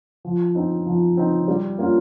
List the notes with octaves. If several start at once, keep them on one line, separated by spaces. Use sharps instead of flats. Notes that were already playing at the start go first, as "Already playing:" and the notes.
F3
C4 D#4
F3
C4 D#4
G3
A#3 C#4 F4